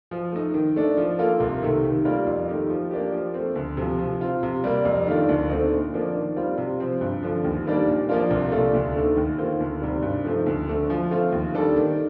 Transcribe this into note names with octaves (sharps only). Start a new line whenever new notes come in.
F3
A3 D#4
D#3
A3 D4
F3
A#3 F4 A4
C2
C3 D#3 A3
D#3
G3 A#3 F4 A#4
F2
D#3 A3 D#4 G4
F3
A#3 D4 G4
F3
A3 C4
D2
C3 F3
F3
C4 F4
C3
G3 A#3
F2
D#3 A3 D4 F4
D2
D3 A3 C4 D#4
A#2
F3 A#3 D4
D#3
G3 C4 F4
C3
F3 C4
G2
D3 F3
D#2
D#3 G3 A#3 D4
A#2
F3 A#3 D4 F4
C2
A#2 A3 D4 F4
D2
D3 A3 D#4
D#2
D#3 A#3 F4 C5
D2
C3 D#3 G3
G2
F3 A3 C4 D#4
D2
D3 A3
F3
A3 C4 F4
D#2
D#3 G3 D4 A4
D#3